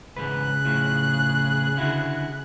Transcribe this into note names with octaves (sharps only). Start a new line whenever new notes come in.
E2 G#2 C#3 G#4 B4 F#6
A2 F3
D3 E4 F#4